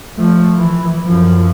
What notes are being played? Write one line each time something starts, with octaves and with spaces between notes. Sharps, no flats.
F3 A3
E3
F#2 F3